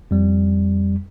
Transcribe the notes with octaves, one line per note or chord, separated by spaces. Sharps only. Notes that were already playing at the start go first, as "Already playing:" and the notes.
F2 G3